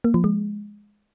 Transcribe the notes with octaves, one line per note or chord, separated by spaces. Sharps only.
A#3
F3
G#3